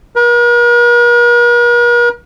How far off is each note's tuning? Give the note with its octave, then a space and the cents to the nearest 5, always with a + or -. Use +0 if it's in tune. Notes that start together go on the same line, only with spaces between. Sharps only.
A#4 +45